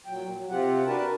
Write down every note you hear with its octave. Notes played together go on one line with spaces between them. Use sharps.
A#2 F#3 G5
F#3
C3 C4 F4 G4 F#5
D4 F#4 A#4 B4 A5